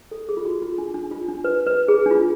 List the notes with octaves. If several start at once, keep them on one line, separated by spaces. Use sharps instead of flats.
A4
G#4
F4
F#4
F4
D4
D4
F4
D4
B4
B4
G#4
D4
F4